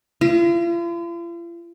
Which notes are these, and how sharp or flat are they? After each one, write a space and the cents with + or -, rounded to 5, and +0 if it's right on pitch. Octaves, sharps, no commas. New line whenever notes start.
F4 -45